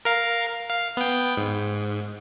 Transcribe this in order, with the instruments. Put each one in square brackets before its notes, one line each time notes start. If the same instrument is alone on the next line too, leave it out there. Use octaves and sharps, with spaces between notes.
[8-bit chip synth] A#4 F5
F5
B3 G5
G#2